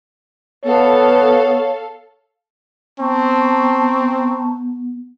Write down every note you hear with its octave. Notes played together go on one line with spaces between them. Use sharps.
B3 A4 C#5 F5
B3 C4 A5 A#5 C#6